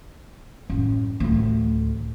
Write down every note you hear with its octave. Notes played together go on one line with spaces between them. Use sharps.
A1 F#2
A1 D2